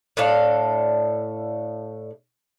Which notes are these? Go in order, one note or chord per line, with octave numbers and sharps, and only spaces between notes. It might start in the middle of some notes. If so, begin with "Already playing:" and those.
A2 D4 A4 F5